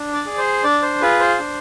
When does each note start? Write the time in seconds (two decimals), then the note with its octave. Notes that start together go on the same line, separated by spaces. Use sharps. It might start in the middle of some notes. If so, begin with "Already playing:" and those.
Already playing: D4
0.13 D5
0.26 G#4
0.38 C5
0.64 D4 D5
0.82 C5
1.01 F4 G#4 B4
1.20 C5
1.39 D4